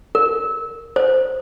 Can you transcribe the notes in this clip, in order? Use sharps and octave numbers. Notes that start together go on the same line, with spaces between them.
A#4
C5